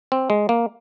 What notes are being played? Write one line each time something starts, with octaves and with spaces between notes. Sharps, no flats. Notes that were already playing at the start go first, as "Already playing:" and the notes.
C4
G#3
A#3